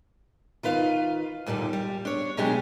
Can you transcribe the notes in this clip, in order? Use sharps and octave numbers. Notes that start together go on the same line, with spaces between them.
D#3 F4 B4 F5
D#2 A#2 D3 G3
G3
D4 C#5
B2 F#3 G#3 D4 G4 G#4